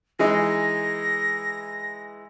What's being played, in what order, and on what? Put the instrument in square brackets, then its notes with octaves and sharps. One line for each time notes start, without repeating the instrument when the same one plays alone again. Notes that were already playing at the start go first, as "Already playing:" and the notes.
[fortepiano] E3 G#3 D#4 [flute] A#6